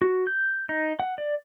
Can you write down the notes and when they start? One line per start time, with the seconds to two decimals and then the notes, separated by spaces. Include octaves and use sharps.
0.02 F#4
0.27 G6
0.69 D#4
1.00 F#5
1.18 D5